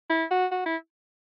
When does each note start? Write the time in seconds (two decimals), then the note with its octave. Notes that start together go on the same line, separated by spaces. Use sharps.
0.10 E4
0.31 F#4
0.52 F#4
0.66 E4